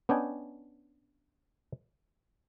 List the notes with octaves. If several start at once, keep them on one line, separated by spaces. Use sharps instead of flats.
B3 C#4 D4 D#5 G5 G#5